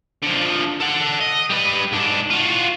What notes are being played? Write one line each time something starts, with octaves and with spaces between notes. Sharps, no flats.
D3 F3
A4 F#5
D#5
G3 B4
G#2 D4
F4 F#4